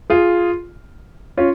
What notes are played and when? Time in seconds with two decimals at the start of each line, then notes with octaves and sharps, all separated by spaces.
0.10 F4 G#4
1.37 C#4 F4